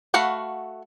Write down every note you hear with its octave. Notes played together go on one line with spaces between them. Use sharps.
A3 F#4 F5 F#5 B5